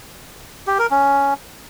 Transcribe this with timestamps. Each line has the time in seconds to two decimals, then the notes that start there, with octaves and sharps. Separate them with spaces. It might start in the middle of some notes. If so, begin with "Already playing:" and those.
0.67 G4
0.79 A#4
0.91 C#4